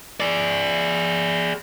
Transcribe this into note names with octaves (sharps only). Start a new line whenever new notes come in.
G#4 D5